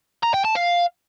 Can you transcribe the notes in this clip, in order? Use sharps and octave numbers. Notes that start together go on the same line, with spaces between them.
A#5
G5
A5
F5